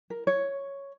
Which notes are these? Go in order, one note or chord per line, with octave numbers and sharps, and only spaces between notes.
A#4
C#5